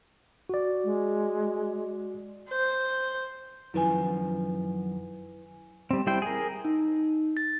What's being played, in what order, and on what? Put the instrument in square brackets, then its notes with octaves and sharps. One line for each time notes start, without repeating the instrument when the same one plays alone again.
[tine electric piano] F#4 D5
[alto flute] G#3
[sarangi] C5
[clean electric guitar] F#2 D#3 F3 [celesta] E4 B4 G#5
[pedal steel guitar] G3 C4
G3 E4 C5 G5
G#4 A#4
[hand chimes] D#4
A6